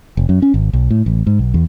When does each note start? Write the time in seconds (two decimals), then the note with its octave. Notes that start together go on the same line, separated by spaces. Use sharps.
0.17 F1
0.29 F#2
0.42 C#4
0.54 G#1
0.73 B1
0.90 A2
1.06 A1
1.27 G#2
1.39 B1
1.54 E2